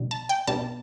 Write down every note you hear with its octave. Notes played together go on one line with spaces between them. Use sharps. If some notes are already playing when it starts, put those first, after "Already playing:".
Already playing: B1 B2 G3
A5
G5
B1 B2 G3 A5